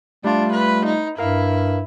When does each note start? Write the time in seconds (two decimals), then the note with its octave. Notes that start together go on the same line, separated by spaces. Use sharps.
0.24 G3 A3 D4 F4
0.53 B4
0.86 D#4
1.18 G2 E4 A#4 F5